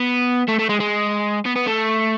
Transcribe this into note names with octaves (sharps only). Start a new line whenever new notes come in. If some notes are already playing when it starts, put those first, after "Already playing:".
Already playing: B3
A3
A3
G#3
G#3
B3
B3
A3